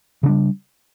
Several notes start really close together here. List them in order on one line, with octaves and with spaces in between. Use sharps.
C#3 D4 G3